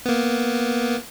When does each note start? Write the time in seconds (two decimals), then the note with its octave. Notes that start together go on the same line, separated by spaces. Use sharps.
0.06 A#3 B3